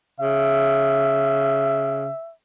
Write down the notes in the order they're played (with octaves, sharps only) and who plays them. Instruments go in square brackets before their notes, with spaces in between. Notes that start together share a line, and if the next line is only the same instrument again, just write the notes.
[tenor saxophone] C#3 [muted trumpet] E5